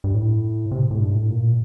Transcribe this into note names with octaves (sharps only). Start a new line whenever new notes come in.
G2
A2
C3
A2
G2
A2
A#2